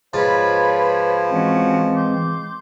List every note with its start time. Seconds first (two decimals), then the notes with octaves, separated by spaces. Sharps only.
0.14 G#2 F3 F4 B4 C#5 B5
1.30 E3 G#3 C4 C#4 F#4
1.93 C6 D6 G6